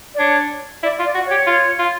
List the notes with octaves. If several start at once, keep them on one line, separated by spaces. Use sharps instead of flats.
D5
D4 C#5
E4 D5
F4
D5
F#4
C#5
G4
F4
F4